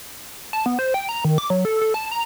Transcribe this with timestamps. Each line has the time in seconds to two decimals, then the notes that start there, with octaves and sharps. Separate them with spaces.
0.53 A5
0.66 B3
0.79 C5
0.94 G5
1.09 A#5
1.25 D#3
1.38 D6
1.50 F#3
1.65 A4
1.82 A4
1.94 A5
2.12 A#5